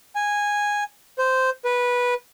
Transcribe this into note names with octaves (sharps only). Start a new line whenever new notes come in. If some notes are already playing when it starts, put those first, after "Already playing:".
G#5
C5
B4